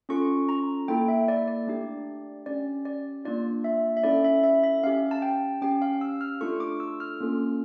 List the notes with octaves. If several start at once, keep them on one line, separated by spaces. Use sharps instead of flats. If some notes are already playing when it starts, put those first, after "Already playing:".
C#4 F4 A4 C#6
A#5
A#3 E4 A4 G5
E5
D5
D5
A3 D4 G4
C#4 G4 D5
D5
A#3 D4 F4 D5
E5
E5
C#4 E4 A4 D5
E5
E5
E5
C#4 G4 F5
A5
G5
C#4 G4 G5
F5
E6
F6
A3 D4 F4 A4 C#6
D6
E6
F6
A#3 C#4 F4 A4